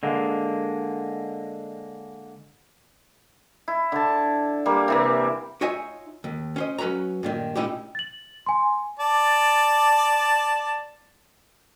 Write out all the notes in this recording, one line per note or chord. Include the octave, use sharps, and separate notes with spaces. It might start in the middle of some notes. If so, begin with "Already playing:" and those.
D3 G#3 A#3
E4
D3 A5
G3 A#3
C3 E3 A#3
D#4 F4 C#5 D#5 E5 G#5
D#2
C#4 C5 D#5
F#3 C#4 B4 C#5 A#5
G2 A#2 D#3
A#2 C#4 D#4 E4 F#4 G4
A6 F#7
G#5 C6
D5 A5